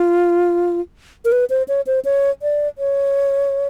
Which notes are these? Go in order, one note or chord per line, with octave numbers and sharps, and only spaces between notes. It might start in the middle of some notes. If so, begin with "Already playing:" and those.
Already playing: F4
A#4
B4
C5
C#5
C5
C#5
D5
C#5